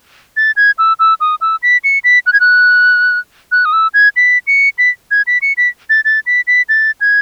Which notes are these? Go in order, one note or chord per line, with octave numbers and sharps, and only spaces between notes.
A6
G#6
E6
E6
D#6
E6
B6
C#7
B6
F#6
G#6
F#6
F#6
D#6
E6
G#6
B6
C#7
B6
G#6
B6
C#7
B6
A6
A6
B6
B6
A6
G#6